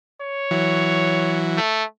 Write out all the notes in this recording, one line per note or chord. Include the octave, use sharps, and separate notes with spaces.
C#5
E3 F#3
A3